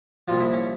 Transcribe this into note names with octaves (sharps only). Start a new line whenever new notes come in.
C2 A#2 F3 F4
E4
C#4